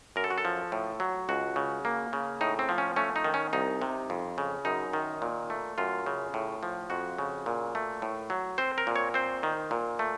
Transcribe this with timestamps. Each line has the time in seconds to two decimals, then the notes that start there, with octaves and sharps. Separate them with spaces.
0.16 F#2 A#4
0.24 A4
0.30 F#4
0.38 A4
0.45 F3
0.72 A2
1.00 F#3
1.29 C#2 F#4
1.56 C#3
1.85 A#3
2.13 C#3
2.41 A2 D#4
2.59 C4
2.69 F3
2.78 C#4
2.96 A3 C#4
3.16 D#4
3.24 D#3
3.34 C#4
3.53 C2 D#4
3.82 C3
4.10 F2
4.38 C#3
4.65 F#2 D#4
4.93 D#3
5.22 A#2
5.50 A3
5.78 F#2 F4
6.06 C#3
6.34 A2
6.63 F3
6.90 F2 F#4
7.18 C#3
7.46 A#2
7.75 A3
8.02 A2
8.30 F#3
8.58 C4 C5
8.78 A#4
8.87 A#2
8.96 C#5
9.14 C4 C5
9.43 D#3
9.71 A#2
9.99 A3